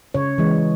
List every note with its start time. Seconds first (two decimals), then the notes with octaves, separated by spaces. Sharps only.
0.14 C#3 C#5
0.38 E3 G#3